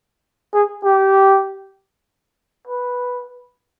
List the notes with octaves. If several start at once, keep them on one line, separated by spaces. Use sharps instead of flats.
G#4
G4
B4